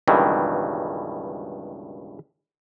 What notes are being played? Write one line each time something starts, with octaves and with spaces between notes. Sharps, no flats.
C#2 G2 B2 D#3 E3